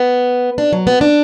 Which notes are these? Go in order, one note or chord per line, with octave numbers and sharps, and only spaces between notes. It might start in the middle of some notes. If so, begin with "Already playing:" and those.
Already playing: B3
D4
F#3
B3
D4